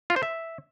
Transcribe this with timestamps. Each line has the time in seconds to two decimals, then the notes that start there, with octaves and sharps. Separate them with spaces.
0.10 F4
0.16 C5
0.23 E5